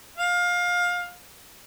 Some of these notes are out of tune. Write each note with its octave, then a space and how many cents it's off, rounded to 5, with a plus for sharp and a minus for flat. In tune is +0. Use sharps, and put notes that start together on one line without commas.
F5 +25